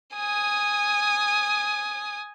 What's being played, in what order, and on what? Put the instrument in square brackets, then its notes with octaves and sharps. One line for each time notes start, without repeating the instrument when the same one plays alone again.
[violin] G#5 D#6